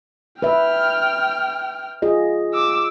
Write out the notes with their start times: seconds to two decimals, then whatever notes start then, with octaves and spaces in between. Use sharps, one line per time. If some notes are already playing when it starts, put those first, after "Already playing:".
0.42 B4 E5 G5 F6
2.02 F4 G#4 D#5
2.54 D6 E6